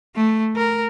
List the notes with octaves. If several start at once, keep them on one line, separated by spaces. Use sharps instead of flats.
A3
A#4